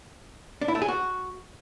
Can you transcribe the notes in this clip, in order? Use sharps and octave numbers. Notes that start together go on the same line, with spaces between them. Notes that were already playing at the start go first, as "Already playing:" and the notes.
D4
E4
A3
G#4
F#4